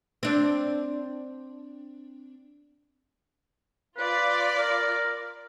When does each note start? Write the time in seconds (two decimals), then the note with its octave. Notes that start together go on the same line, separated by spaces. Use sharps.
0.23 C4 D4
3.98 F4 B4 D5
4.59 A#4